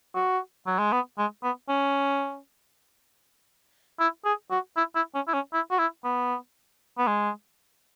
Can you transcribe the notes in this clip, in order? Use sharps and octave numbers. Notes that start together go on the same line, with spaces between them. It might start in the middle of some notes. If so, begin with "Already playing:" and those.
F#4
F#3
G#3
B3
G#3
B3
C#4
E4
G#4
F#4
E4
E4
C#4
E4
C#4
E4
F#4
E4
B3
B3
G#3